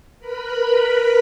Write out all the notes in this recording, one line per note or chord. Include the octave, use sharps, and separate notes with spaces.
A#4 B4 B5